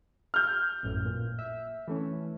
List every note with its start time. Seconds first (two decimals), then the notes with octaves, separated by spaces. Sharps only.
0.34 F6 G6
0.83 A1 F#2 A2
1.05 A#2
1.39 E5
1.88 E3 A3 C#4